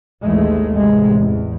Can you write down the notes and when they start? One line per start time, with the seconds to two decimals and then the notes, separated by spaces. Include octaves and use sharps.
0.22 A1 D#2 E3 G#3 A3
0.74 A1 C3 G#3
1.16 E2